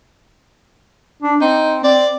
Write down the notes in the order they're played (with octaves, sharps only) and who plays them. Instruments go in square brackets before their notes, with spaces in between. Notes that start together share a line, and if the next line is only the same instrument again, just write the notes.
[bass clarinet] D4
[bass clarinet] C4 [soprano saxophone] D#4
[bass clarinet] C4 [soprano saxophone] D5